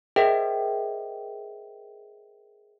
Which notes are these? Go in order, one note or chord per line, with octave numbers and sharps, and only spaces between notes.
G#4 A#4 C5 D#5 E5 G5